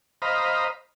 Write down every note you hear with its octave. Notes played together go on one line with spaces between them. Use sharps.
C5 D#5 F5 A#5 B5